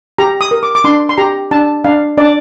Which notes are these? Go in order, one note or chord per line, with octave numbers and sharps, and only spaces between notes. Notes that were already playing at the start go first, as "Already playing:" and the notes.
G4 A#5
D#6
A#4
D6
D6
D4 C6
C6
G4 A#5
D4 A5
D4 F5
D4 D5